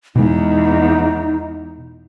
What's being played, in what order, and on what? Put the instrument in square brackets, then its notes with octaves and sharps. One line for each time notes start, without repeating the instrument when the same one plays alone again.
[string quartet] E2 [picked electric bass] B2 G#3 [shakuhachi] D#4